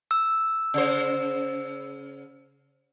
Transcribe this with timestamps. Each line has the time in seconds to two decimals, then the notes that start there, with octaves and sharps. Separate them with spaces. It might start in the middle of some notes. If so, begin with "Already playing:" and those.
0.11 E6
0.74 C#3 C5